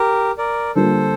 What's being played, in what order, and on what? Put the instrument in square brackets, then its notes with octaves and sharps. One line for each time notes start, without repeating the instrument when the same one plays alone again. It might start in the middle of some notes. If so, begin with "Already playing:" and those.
Already playing: [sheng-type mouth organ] G4 A#4
A#4 D5
[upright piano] D3 G3 A#3 F4 [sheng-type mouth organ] A4 C5